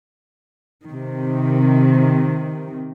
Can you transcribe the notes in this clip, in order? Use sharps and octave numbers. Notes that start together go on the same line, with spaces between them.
C3 D#3